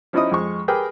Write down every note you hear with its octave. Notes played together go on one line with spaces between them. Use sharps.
F3 C#4 D#4 E4 D#5 D#6
F2 G#3 C#6
G4 G#4 A#4 B4 G5